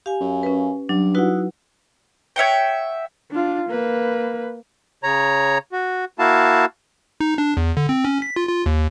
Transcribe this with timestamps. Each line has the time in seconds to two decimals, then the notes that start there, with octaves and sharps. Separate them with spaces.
0.06 G4 F5 G#5
0.21 F#2
0.43 C#4 B4
0.89 G2 F#3 D4
1.15 D#4 E4 F#4 B4 F#5
2.36 C#5 E5 F#5 G5
3.31 D4 F4
3.69 A#3 B4
5.03 C#3 C#5 A#5
5.72 F#4
6.19 A#3 E4 F#4 F5 A5
7.20 D#4
7.38 D4
7.57 E2
7.77 D3
7.89 C4
8.05 C#4
8.22 B6
8.36 F4
8.49 F4
8.66 D#2